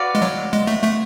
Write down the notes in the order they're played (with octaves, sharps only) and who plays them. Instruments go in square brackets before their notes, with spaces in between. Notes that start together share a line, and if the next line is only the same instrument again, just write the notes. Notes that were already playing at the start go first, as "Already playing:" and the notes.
Already playing: [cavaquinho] F#4 B4 D5 F5
[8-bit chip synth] G#3
F#3
G#3
A3
A3